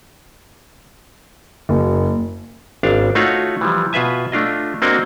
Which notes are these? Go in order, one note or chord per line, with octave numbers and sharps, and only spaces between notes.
F#1
G#1 D4 F5
A3 D#4 F4 F#4 C#5 F#5
E3 F3 G3
B2 F4 B4 E5 G#5
A3 D4 F4 D#5
A#3 C4 D4 F#4 D#5 G#5